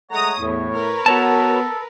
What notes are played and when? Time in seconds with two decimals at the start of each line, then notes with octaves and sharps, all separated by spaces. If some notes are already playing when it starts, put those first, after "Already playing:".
0.11 G#3 A3 C#5 F#5 A#5 D#6
0.39 E2 A2
0.75 A#4 B4
1.06 B3 F#4 A4 C#5 A5